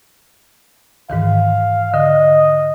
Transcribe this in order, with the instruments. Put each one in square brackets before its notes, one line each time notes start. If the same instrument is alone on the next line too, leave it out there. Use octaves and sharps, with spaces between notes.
[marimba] G#2 D#3 E3 [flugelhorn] F5
[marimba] D3 [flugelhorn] D#5